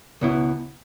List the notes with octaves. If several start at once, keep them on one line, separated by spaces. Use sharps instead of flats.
C#2 B2 B3 E4